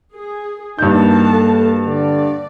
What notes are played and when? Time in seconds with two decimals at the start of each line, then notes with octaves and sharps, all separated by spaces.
0.13 G#4
0.79 G2 A#3 D#4 F#4 A5 G6
1.31 A4
1.86 D3 D5